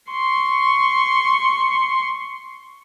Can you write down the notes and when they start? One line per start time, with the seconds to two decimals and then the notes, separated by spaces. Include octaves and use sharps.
0.11 C6 C#6